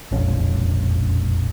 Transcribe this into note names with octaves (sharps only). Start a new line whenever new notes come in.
E1 A#1 F2 C#4